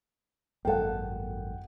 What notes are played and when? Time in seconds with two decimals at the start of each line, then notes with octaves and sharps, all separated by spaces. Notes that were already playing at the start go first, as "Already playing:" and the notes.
0.65 G#1 F#2 A#3 A4 F#5 G5